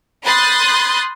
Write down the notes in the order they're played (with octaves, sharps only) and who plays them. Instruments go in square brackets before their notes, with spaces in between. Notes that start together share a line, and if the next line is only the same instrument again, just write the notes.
[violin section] B5 C6 D#6 F#6 G6 A6